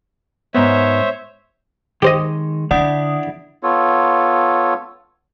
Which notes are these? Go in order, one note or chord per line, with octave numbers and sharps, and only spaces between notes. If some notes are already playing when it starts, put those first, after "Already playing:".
G#2 B3 C5 C#5 E5
D#3 G#3 G4 C5 D#5
D3 D4 E4 D5 F#5 D#6
B3 F4 A4 C#5